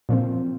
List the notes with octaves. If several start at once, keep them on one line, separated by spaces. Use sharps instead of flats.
A#2 F3 C4